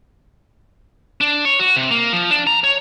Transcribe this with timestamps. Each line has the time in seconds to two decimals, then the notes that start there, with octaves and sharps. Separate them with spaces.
1.21 D4
1.45 C#5
1.59 F#4
1.76 C3
1.91 A#3
2.12 F3
2.31 D4
2.47 A#5
2.64 C#5